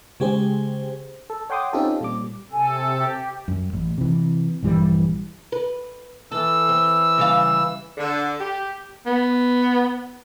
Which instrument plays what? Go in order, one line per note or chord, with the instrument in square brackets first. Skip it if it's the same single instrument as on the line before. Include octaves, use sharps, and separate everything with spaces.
[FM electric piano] C#3 G#3 G4 G#4 C5
A4
C#5 F#5 G5 C6 D6 D#6
C4 C#4 D#4 F4 G4 A4
A#2 G3 D6
[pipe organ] C3 A4 [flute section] G#5
[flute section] G4
[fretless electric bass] F#2
A1
C3 E3
A#1 G2 E3 G3
[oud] B4
[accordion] E3 E6 [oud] A4
[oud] C4
C#3 G3 F5
[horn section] D3
G4
[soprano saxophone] B3